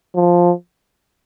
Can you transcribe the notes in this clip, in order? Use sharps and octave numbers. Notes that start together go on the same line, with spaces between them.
F3